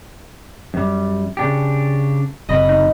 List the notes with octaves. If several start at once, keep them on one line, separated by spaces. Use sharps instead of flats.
F#2 G3
C#3 D4 G4
F#1 C3 F#3 D#5 B5 A#6
D#4